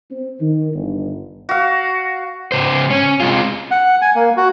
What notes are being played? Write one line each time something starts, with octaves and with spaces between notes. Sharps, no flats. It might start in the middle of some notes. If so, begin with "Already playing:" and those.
C4
D#3
G1
F#4 F5
G#2 C#3 C5
C#4
C3 G#3 F4
F#5
G#5
A#3
F#4